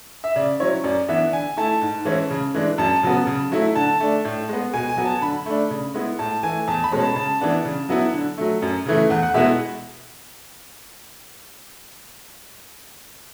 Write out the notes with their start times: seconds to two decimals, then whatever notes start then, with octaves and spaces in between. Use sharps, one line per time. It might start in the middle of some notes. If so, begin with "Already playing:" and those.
0.24 E5
0.36 C#3 D5
0.60 F#3 C#4 E4 C#5
0.84 F#2 D5
1.08 E3 B3 D4 E5
1.32 D3 G#5
1.57 A3 E4 A5
1.81 G#2
2.05 E3 G#3 C#4 E4
2.30 C#3
2.54 E3 G#3 D4
2.78 F#2 A5
3.03 C#3 F#3 B3
3.27 C#3
3.51 F#3 A3 E4
3.75 D3 A5
4.00 A3 D4
4.25 A2
4.49 G#3 B3
4.73 B2 G#5
4.89 G#5
4.97 F#3 B3
5.05 A5
5.22 D3 B5
5.46 A3 D4
5.70 C#3
5.94 G#3 B3 E4
6.19 A2 A5
6.43 E3 A3 G#5
6.68 E2 A5
6.84 B5
6.92 B2 G#3 C#4
7.00 A5
7.16 C#3 A5
7.41 E3 B3 D4
7.65 C#3
7.89 F#3 B3 E4
8.14 D3
8.38 F#3 A3
8.62 F#2
8.86 C#3 E3 A3
9.10 E2 F#5
9.23 F#5
9.34 B2 G#3 B3 E4 E5